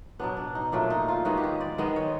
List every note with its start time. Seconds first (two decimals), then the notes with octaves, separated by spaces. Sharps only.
0.19 B2 F#3 B3 D4
0.37 D4
0.55 D#4
0.72 A#2 F#3 A3 D4
0.90 D#4
1.08 F4
1.25 D#3 G#3 B3 F#4
1.37 G4
1.44 G#4
1.61 D5
1.78 D#3 G#3 B3 D#5
1.96 C#5